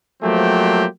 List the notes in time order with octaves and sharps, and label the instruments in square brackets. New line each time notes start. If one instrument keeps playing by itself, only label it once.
[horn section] F3 F#3 A3 A#3 C4 G4